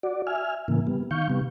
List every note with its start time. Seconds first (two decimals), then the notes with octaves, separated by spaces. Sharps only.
0.03 F#4 D5
0.27 E5 G#5 F6
0.68 A2 C#3 E3 A#3
0.87 G3 B3
1.11 D#3 F5 C#6 G6
1.29 C3 G3 B3